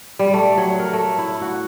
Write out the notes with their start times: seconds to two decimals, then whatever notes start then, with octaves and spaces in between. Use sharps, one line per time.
0.19 G3
0.34 A3
0.57 F#3
0.79 A#4
0.93 A3
1.18 E4
1.41 F#4